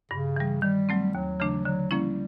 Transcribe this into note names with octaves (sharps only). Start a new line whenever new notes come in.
G2 C#3
E3 G3
D#3 G3
F#3 A3 C4
D#2 F#3
C#3 E3 A3 D4
D3 F#3
F3 G3 A#3 C#4 E4